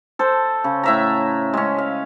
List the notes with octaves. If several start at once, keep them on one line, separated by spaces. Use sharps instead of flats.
A4 C5
C#3
A2 E5 A#5
G#3 C#4
F5